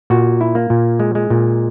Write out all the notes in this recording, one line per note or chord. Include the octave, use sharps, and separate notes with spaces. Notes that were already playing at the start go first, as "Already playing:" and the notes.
A#2 F#4
E4
A#3
A#2
G#3
G#3
A#2